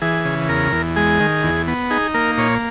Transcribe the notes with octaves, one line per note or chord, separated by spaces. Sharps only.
E3 G#4
C#3
E2 A#4
E2
G#3 G#4
D#3
E2
B3
D#4 G#4
A#3 A#4
A#2 C#5